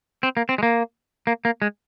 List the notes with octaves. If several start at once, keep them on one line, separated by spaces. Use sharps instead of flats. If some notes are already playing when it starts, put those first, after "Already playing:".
C4
A#3
C4
G#3
A#3
A#3
A#3
G#3